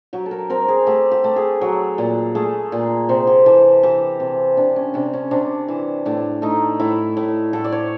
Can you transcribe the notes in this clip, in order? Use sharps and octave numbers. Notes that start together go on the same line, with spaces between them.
F#3 G4
A4
A#4
C4 A#4
G#4
A3 G4
G4
A3
G#4
F#3
A#2
A3 G#4
A#2
C3 C5
G4
E3 A4
E3 G4
C3
C3 D4
C#4
C3 D4
C#4
C3 D4
E3
A2 D4
A3 D#4
A2 E4
A2
A2 A4
D5
C#5